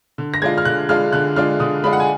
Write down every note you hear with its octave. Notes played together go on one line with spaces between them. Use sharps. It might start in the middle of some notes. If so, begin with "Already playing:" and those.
D3
A#6
G#3 D4 F4 G#6
F6
D3 F#6
G#3 D4 F4 F6
D3 F#6
G#3 D4 F4 F6
D3 D#6
G#3 D4 F4 B5
F#5
G#5